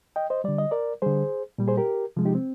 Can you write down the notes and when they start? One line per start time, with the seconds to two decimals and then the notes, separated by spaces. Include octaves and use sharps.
0.16 D#5 G5
0.30 C5 D#5
0.44 D3 G3 D5
0.58 D#5
0.71 A#4 D5
1.02 D3 G3 G#4 C5
1.58 A#2 G3
1.68 G#4 C5
1.77 G4 A#4
2.16 C3 F3 G#3
2.25 D#4 G4
2.35 C4